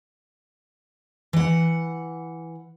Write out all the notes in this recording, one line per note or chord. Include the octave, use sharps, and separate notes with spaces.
E3 F#5